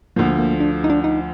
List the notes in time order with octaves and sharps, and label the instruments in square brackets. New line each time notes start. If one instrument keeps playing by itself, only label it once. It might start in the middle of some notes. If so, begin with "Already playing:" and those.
[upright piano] D2 D3 F3 [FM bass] A#3
[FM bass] A#3
D4
D#4
D4
D#4